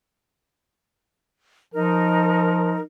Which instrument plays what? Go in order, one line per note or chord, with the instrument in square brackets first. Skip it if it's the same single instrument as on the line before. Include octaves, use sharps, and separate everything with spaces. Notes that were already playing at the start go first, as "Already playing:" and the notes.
[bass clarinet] F3 [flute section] D#4 A#4